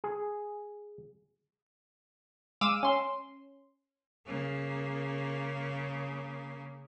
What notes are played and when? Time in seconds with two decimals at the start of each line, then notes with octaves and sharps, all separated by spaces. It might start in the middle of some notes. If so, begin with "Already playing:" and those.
0.04 G#4
2.61 G#3 F5 D6 E6 D#7 E7
2.83 C#4 C6
4.27 C#3 A#3